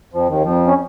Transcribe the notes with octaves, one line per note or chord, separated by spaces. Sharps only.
F2 F3
D#2 D#3
F2 F3
C#4